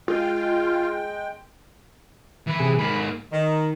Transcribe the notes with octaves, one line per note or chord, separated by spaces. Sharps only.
G#3 F4 G5
E3 B5
C3 G#4
G#2 A#3 B5
D#3